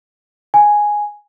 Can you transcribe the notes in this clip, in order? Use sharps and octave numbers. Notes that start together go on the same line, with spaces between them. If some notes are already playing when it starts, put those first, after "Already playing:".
G#5